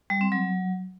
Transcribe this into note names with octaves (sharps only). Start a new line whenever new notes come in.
G3
C4
F#3